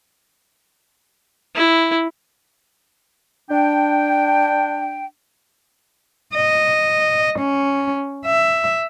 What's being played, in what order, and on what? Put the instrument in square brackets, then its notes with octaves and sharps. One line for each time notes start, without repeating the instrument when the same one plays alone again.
[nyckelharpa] E4
[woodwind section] D4 G5
[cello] D#5
C#4
E5